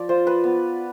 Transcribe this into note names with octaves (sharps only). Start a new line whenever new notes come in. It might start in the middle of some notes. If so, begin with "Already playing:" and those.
Already playing: F3 D5
F4 C5
B4
B3